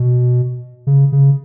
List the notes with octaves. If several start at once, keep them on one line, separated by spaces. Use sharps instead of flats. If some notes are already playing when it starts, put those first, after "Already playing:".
Already playing: B2
C#3
C#3